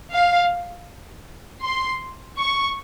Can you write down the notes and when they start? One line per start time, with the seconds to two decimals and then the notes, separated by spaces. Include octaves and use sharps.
0.12 F5
1.63 C6
2.39 C#6